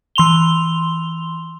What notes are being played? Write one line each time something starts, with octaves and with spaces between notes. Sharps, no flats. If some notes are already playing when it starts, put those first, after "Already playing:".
E3 C6 F7 G7